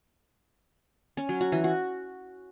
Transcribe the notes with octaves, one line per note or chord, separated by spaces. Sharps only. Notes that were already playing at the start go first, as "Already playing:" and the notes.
C#4
F#3
F#4
E3
F#4